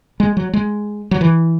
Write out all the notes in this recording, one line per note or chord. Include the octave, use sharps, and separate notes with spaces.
G#3
F#3
G#3
F#3
E3